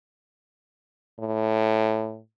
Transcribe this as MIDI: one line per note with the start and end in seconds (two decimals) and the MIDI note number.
1.19 2.20 45